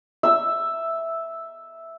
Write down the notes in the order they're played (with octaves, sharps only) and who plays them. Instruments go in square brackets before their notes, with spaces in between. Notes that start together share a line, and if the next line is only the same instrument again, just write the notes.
[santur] E5 E6